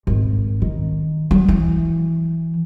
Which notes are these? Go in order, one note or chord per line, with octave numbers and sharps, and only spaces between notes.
G#1
D#3
F#3
E3